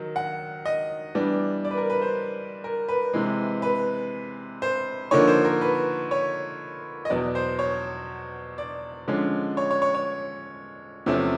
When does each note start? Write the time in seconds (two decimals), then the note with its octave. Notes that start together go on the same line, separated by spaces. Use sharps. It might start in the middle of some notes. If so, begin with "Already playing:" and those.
Already playing: D#3 F#3
0.16 F#5
0.65 D#5
1.15 E3 G3 B3 D4
1.65 D5
1.71 B4
1.77 A#4
1.90 B4
2.01 C5
2.64 A#4
2.89 B4
3.13 C3 E3 G#3
3.62 B4
4.62 C5
5.11 D3 F3 A#3 D#4 C#5
5.28 C5
5.45 A#4
5.61 B4
6.11 C#5
7.05 D#5
7.10 E2 B2 F#3 B3 D5
7.35 C5
7.59 C#5
8.58 D5
9.08 D3 F3 G#3 C#4
9.57 C#5
9.71 C#5
9.82 C#5
9.94 C#5
11.06 E2 C3 F3 A3 C#4